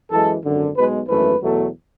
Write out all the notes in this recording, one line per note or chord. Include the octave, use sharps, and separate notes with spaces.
F#2 E3 G#3 A4
G#1 F#2 D3
B1 B2 G#3 B4
G#1 F#2 E3 A3 B4
E2 B2 F#3 A3